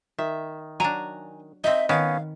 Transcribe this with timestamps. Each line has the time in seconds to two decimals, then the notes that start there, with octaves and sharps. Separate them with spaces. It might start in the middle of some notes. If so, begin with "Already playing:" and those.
0.19 D#3 E5
0.80 F#3 D4 G#5 A#5
1.64 C4 D#4 D#5 E5
1.89 D#3 B3 C#4 F5